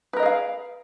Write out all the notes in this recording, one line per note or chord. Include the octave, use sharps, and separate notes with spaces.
G#4 A#4 B4 D#5 F5